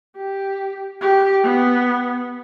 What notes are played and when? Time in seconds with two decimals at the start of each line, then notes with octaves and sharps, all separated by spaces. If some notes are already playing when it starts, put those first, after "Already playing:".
0.17 G4
1.01 G4
1.43 B3